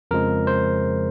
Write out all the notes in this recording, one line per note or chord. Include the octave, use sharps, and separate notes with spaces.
F2 C#3 F3 G#3 A#4
C5